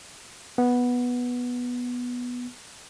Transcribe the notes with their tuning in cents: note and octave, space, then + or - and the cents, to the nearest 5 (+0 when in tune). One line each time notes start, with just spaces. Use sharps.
B3 -5